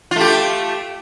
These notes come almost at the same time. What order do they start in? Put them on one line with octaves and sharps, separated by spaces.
F4 A3 G4